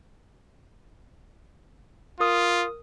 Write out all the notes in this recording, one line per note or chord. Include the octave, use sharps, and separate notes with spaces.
F4 A#4 D#6